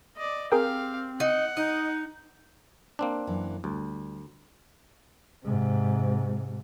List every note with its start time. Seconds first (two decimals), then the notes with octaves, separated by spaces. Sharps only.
0.16 D5 D#5
0.52 C4 G4 G#4 A#4 F5 G5
1.20 D#4 F#5
1.57 D#4 D#5
2.99 A#3 C4 D4
3.27 F#2 E3
3.64 D2 G3
5.45 G#2 C3